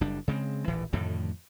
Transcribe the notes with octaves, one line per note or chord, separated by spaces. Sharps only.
F#1 G3 D4
C#3 G#3 B3 C4
D#1 A#1 A2 E3
F2 A2 D3 D#3